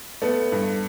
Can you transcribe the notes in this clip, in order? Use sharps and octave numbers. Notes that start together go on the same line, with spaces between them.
A3 B3
G2